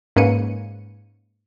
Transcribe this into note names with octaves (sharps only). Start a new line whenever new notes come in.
G#2 A#3 C#4 B4 C#7 D#7